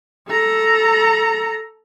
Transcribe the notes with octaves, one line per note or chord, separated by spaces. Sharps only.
A4 A#5